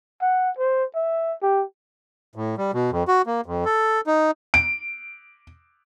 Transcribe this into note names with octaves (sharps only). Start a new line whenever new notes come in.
F#5
C5
E5
G4
A2
G3
B2
F2
F#4
A#3
F2
A4
D#4
D7